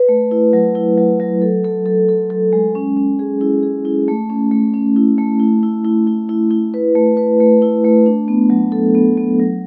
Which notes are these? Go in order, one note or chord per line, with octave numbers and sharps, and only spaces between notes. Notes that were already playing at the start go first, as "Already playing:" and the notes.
Already playing: B4
A3
E4
F#3
E4
F#3
F#3
A4
A4
A4
A4
A4
G#3
C#4
C#4
G#4
E4
G#4
E4
A3
C#4
A3
C#4
E4
A3
E4
E4
E4
E4
E4
E4
B4
A3
B4
A3
E4
A3
D4
B3
F#3
A4
B3
B3
F#3